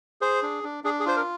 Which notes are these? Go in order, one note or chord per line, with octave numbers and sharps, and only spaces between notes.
G#4 C5
D4
D4
D4 G#4
G#4
F4 C5
A#4